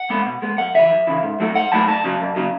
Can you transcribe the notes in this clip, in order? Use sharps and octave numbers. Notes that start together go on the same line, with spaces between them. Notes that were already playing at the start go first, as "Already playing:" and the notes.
Already playing: F#5
G#3 B3
B2
G#3 B3
F#2 F#5
C#3 E3 E5
F#2
C#3 E3
G#2
F#3 A3 E4
G#2 F#5
F#3 A3 E4 A5
F#2 A5
C#3 F#3
F#2
C#3 F#3